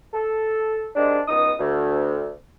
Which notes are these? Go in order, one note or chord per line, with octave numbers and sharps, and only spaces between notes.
A4
C3 D#3 G#3 D4
C#2 B3 D#4 D#6
D2